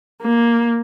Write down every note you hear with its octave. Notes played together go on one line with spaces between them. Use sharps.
A#3